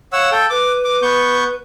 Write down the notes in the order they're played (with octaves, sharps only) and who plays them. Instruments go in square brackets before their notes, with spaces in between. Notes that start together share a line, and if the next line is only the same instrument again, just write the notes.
[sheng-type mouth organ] C#5 F#5 E6 [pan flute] F5
[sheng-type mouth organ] A4 G5
[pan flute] B4 [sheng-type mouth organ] D6
[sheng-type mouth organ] D6
B3 C#6 G6